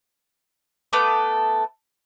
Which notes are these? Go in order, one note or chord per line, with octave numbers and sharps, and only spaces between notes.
A3 B3 A4 D6